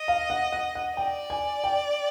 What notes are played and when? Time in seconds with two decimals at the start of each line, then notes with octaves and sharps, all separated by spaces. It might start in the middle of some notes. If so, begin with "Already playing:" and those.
Already playing: D#5
0.08 F5
0.30 F#5
0.52 F#5
0.75 F#5
0.97 D5 G5
1.30 G#5
1.64 G5